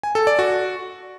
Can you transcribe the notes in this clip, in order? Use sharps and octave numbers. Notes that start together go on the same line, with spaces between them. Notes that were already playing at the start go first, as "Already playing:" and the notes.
G#5
A4
D5
F#4